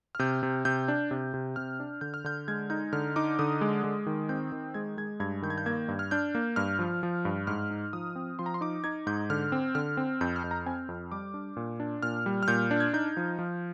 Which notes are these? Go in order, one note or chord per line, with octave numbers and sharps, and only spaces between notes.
F6
C3 G6
C3
C3 G6
D4
C3
C3
C3 F6
D4
D3 G6
F6
D3 G6
G#3 G#6
D#4 G6
D3 F6
D#4 D6
D3 D#6
G#3
G#3
D#3
C4 G6
D#3
G#3 G#6
G#3 G#6
G2 G#6
D#3 G6
G#6
G6
A#3 G#6
G2
F6
D4 G6
A#3
G2 F6
F3
F3
G2
G#2 F6
D#4
F3 D#6
C4
F3 C6
A#5
C6
D#4 D6
D#4 G#6
G#2 G6
D3 F6
C4
D3 F6
C4
F2 G6
F6
F2
A#5
C4 G#5
F2
G3 D6
D4
A#2
D4
A#2 F6
G3
F6
A#2 G6
D4
G#6
D#4 G6
F3
F3